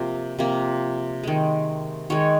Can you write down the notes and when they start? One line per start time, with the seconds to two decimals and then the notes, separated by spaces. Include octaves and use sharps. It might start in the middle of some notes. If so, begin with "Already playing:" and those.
Already playing: C3 F3 A#3
0.39 C3 F3 A#3
1.23 D#3 G#3
2.10 D#3 G#3 C#5